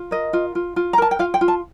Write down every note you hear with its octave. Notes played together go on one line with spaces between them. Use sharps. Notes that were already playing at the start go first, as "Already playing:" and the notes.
Already playing: F4
A#4 D#5
F4
F4
F4
A#5
A#4 A5
G5
F4 F5
G5
F4
A5